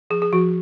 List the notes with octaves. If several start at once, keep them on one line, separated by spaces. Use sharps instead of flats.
F3 G#4
G#4
F3 F#4